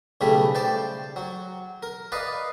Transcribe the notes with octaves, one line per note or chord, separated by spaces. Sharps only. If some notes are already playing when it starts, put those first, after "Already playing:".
B1 C#3 G3 A3 B5
C5 D5 G5 A5
F#3
A#4
B4 D5 D#5 F5